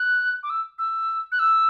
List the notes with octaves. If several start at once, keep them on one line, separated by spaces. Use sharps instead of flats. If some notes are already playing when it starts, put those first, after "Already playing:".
Already playing: F#6
D6
E6
E6
F#6
E6